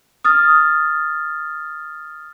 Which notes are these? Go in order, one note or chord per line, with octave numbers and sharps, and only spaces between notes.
D#6 F6 A6